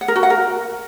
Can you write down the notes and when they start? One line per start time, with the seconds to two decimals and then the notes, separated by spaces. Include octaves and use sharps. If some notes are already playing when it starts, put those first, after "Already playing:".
0.01 F#5
0.08 A#4
0.16 F#4
0.23 F#5
0.30 A#4